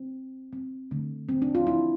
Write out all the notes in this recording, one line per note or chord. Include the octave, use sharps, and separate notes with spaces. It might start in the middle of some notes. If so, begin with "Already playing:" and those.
Already playing: C4
C4
D3 A3
C4
D4
F4
E4